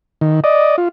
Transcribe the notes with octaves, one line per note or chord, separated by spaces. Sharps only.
D#3
D5 D#5
F4